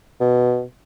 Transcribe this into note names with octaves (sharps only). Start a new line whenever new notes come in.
B2